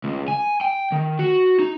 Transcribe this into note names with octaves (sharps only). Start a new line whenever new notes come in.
C#2
G#5
G5
D#3
F#4
D#4